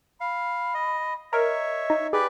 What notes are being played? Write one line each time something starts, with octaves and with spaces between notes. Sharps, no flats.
F5 B5
D#5
A#4 C#5 D#5 E5
D#4
G4 G#4 B4 D5